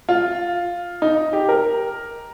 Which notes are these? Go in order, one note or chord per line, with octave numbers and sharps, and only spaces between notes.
F4
D#4
G4
A#4